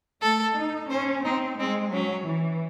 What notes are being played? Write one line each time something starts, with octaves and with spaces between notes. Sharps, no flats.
A3 A4
D#4
C#4 C5
C4 D#4
G#3 C4
F#3 C#4
E3